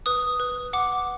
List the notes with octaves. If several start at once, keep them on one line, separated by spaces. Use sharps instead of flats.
B4 D#6
B4
F#5 D6